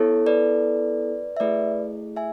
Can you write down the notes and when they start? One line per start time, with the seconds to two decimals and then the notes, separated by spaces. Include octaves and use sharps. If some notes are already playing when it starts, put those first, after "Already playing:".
Already playing: B3 E4 A4 C#5
0.26 B4 D5
1.37 E5
1.40 A3 E4 G#4 B4 D5
2.16 E5 G#5